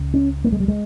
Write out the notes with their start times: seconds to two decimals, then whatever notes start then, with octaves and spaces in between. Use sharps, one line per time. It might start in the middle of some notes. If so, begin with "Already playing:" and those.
Already playing: C#2 C#3
0.14 C#4
0.45 A#3
0.52 G#3
0.60 G3
0.68 G#3